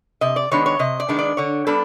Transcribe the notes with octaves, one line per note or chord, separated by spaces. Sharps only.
C3 D#5
D5
D#3 G#3 B3 D4 C#5
C#5
C3 D#5
D5
D#3 G#3 B3 D4
D5
D3 C#5
G3 B3 D4 A4